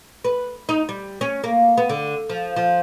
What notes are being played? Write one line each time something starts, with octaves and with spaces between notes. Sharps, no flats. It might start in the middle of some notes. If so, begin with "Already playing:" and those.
B4
D#4
G3
C#4
A#3
B3
D3
F3
F3